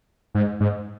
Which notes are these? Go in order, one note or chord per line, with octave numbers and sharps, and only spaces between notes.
G#2
G#2